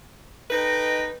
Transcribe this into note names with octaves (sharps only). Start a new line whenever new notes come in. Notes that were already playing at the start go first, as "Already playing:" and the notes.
D#4 A4 B4 D#5 G5